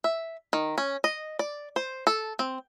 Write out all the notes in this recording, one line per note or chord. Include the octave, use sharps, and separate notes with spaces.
E5
D#3
C#4
D#5
D5
C5
A4
C4